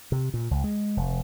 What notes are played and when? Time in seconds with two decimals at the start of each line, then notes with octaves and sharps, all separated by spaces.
0.12 C3
0.34 A#2
0.51 C#2
0.64 G#3
0.97 F1